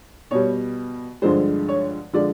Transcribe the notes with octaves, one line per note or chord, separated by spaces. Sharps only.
B2 G3 C#5
G2 D3 F3 G#3 C5
C#5
D3 F3 G#3 D5